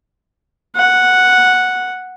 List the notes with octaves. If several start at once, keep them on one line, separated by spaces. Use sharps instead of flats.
F#5